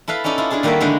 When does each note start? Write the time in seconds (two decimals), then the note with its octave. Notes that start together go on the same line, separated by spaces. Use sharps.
0.08 E4 A4 B4 F5
0.24 C#4 D#4 E4 A4 D5
0.38 E4 F4
0.50 D4 E4 F4 G#4 A5
0.63 D#3 G3 A#3 F#4 A4 E5
0.80 D3 G#3 A#3 D#4 E4